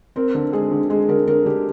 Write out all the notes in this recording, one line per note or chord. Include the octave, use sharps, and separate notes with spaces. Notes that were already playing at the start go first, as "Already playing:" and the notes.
C4 A#4
D3
G#3 G#4
D3
G#3
D3 A#4
D3 A#4
D3 G4